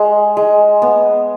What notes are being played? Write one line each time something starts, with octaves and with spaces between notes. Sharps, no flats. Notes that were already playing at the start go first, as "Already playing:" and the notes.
Already playing: G#3
G#3
B3